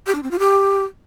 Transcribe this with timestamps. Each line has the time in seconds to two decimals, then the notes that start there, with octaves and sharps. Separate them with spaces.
0.07 G4
0.15 D4
0.23 C4
0.31 F4
0.39 G4